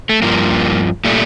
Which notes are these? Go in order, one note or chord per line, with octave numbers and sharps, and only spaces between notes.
A3
G2 F3 A#3
A#2 G3 A3